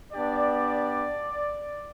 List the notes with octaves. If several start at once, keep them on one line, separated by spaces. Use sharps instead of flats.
B3 D4 G4 D5